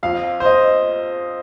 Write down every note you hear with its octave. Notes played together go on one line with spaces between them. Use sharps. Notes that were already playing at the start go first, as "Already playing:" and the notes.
F2 F3 F5
C5
D#5